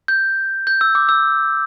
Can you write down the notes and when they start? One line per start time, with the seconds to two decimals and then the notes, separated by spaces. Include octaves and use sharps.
0.08 G6
0.67 G6
0.81 E6
0.95 D6
1.09 E6